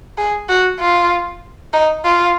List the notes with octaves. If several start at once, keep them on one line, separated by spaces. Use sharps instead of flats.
G#4
F#4
F4
D#4
F4